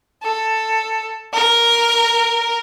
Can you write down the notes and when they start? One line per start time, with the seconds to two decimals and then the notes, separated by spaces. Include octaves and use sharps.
0.23 A4
1.33 A#4